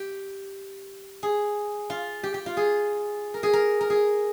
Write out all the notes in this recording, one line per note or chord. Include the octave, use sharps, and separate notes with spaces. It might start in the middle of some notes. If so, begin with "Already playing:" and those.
Already playing: G4
G#4
F4
G4
G4
F4
G#4
A#4
G#4
A#4
A#4
G#4